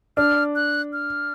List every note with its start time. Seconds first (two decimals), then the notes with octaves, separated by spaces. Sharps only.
0.17 D4 F6
0.55 F#6
0.93 F6